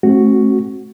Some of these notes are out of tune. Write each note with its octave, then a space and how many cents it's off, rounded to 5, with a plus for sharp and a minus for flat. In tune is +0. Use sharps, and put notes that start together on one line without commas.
A3 -25 C4 +40 F#4 +0